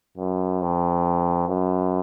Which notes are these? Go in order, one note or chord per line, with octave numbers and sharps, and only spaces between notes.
F#2
F2
F#2